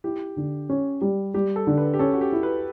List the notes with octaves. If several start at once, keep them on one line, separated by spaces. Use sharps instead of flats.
E4 G4
D3
C#4
G3
G3 G4
A4
D3
B4
G4
C#4 A4
F#4
G4
E4
B4